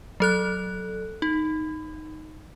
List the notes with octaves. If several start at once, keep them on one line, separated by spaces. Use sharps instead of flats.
F#3 A4 F#6
D#4